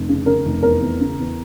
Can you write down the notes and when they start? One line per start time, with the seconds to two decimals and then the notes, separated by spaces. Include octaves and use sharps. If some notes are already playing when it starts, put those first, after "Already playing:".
Already playing: F1
0.09 C#3
0.26 C#3 A#4
0.45 F1
0.63 E2 A#4
0.81 E2
1.00 C#3
1.19 E2